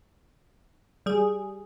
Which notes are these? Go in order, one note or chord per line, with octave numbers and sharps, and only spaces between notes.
G3 G#4